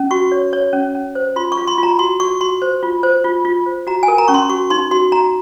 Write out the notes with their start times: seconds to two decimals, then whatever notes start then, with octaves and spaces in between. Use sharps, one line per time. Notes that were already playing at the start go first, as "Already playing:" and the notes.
Already playing: C#4
0.11 F#4 C#6
0.32 C#5
0.53 C#5
0.73 C#4
0.95 C#4
1.15 C5
1.36 F4 C6
1.52 C#6
1.57 F4
1.68 C6
1.78 F4
1.83 A#5
1.99 F#4 C6
2.20 F#4 C#6
2.41 F#4 C6
2.62 C5
2.83 F4
3.03 C5
3.24 F4
3.45 F4
3.66 C5
3.87 F#4 A#5
4.03 G#5
4.08 A#4
4.18 A#5
4.28 C#4 C#6
4.34 C6
4.49 F#4 C#6
4.70 D#4 C6
4.91 F#4 C6
5.12 F#4 A#5